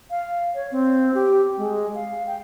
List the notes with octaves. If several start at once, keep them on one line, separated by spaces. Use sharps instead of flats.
F5
C#5
C4
G4
G#3
F5
G5